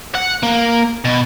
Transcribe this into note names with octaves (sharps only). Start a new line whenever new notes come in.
F#5
A#3
B2